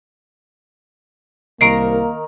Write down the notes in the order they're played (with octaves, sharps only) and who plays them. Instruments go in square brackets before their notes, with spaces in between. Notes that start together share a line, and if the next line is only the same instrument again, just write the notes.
[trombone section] C2 [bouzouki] D#3 A#4 A#5 [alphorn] A#3 [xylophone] C7 D7